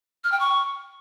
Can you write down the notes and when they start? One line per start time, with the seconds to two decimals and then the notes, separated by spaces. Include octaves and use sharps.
0.24 F6
0.32 G5
0.40 C#6